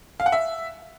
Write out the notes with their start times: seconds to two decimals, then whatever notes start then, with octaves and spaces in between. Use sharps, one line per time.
0.20 F5
0.26 F#5
0.32 E5